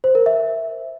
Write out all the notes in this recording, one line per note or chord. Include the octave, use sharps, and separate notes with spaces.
C5
A#4
E5